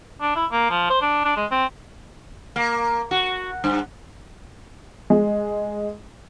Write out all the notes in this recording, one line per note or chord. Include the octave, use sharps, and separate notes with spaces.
D4
E4
A#3
F3
C5
D4
D4
G#3
C4
A#3
F#4
G2
G#3